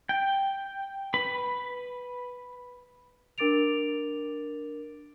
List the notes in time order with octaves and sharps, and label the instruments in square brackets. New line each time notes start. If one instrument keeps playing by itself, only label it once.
[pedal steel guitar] G5
B4 B5
[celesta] D4 A#4 D6 A6 D7 F7